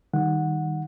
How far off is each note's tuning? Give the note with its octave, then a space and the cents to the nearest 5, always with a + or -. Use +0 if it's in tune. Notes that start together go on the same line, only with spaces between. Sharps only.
D#3 +0 G3 +0 F#5 -10